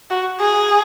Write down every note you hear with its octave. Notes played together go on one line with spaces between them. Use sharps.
F#4
G#4